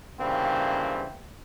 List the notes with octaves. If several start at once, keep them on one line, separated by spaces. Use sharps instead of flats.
G2 C#3 E3 A#3 C4